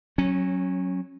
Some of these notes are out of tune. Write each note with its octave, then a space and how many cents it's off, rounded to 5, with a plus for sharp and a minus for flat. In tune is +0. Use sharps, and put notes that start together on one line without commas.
F#3 +0 C#4 -20